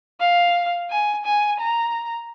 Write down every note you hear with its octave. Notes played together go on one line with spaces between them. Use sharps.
F5
G#5
G#5
A#5